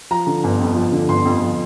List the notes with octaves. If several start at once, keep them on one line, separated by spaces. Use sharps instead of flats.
F3 A#5
D3
G1
F2
F3
D3
G1 C6
F2
F3